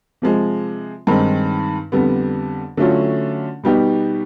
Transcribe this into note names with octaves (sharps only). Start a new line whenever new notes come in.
C3 F3 G#3
G2 D#3 G#3 C4 D#4
F2 D3 G3 B3
D3 F#3 A3 C#4 F4
B2 G3 B3 D#4 G4